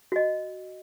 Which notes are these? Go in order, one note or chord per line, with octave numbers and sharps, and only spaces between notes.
F#4 D#5